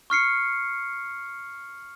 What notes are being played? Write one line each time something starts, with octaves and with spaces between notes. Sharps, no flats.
C#6 F6 C7 C#7